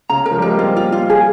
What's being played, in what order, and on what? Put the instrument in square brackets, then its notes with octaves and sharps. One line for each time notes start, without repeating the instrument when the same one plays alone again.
[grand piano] C#3 [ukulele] A#5
[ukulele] A#4
[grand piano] F3
G3
[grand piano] G#3 [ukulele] A#4
[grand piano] A#3
[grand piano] C4 [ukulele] F4
[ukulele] F4
F4
G#4